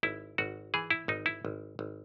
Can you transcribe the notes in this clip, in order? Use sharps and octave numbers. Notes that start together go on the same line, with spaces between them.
G#1 E4
G#1 F#4
E3 G#4
E4
G#1 D#4
E4
G#1
G#1